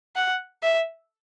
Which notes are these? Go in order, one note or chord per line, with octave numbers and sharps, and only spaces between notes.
F#5
E5